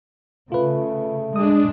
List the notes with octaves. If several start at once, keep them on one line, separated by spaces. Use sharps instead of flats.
C#3 A3 F4 B4
G#3 D4 D#6